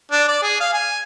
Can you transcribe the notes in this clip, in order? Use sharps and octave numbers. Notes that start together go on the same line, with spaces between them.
D4
D5
G#4
F5
G#5